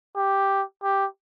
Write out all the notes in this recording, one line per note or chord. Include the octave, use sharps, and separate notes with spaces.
G4
G4